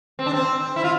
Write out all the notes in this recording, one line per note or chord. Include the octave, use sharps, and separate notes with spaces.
C4
D4
C4
E4
F4